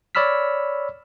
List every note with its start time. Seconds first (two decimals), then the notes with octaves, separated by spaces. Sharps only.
0.15 C#5 D5 B5 E6 F6 B6